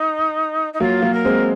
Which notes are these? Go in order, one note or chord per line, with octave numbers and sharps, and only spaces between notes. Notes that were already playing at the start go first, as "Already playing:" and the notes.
Already playing: D#4
D#4
F#3 A#3 F4
F#3 A#3
A#4
G#3 C4